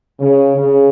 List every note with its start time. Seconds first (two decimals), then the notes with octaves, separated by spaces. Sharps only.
0.20 C#3
0.57 C#3